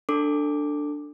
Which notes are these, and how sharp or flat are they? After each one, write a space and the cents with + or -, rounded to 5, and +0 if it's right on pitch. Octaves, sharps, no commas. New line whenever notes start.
D4 +5 A4 +20 D6 +0